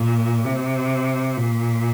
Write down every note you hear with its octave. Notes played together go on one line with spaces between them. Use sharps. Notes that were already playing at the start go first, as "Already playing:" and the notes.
Already playing: A#2
C3
A#2